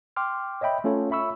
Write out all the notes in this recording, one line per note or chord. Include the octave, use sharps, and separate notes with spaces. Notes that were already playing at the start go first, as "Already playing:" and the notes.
G5 C6 D6 F6
C#5 D#5 E5 G5 B5
A3 C#4 F4 A4 C#5
E5 B5 C#6 E6